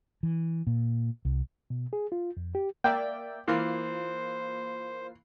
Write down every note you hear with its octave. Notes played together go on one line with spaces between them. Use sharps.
E3
A#2
C2
B2
G#4
F4
F2
G4
A#3 D5 E5 G5
E3 A#3 F4 C5 C7